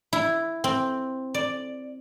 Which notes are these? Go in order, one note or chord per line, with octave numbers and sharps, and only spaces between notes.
E4
C4
D5